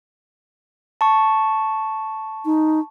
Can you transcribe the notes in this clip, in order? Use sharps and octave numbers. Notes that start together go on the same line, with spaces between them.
A5 C#6
D#4